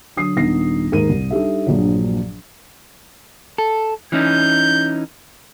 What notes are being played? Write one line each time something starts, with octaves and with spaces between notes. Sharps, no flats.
D3 F#3 D#6 C7
D#1 B3 D4 D#4 A#6 C7
D#2 G#2 A#4 D#7
C2
G3 D4 D#4 G4 A4 E5
A#1 G2 A#2 F3 F#3
A4
E3 C#4 D#4 G6